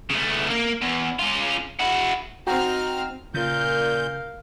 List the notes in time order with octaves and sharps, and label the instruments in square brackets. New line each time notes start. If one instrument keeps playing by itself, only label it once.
[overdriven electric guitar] C#3 A3
A#3
E2
C#4 F4
E4 F#4
[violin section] C4 D#4 F6 [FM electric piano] F#4 G5 A#5
[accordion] A#2 G6 [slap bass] C#3 [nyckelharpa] A#4 F5